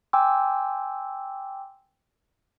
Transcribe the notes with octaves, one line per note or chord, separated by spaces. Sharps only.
G5 G#5 C6 D6 E6